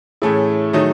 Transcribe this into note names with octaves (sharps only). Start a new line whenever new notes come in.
A2 E3 A3 C#4 E4 G#4
D#3 F#3 A3 D#4